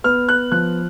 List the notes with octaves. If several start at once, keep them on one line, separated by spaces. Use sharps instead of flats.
B3 F6
F#6
F3 F#6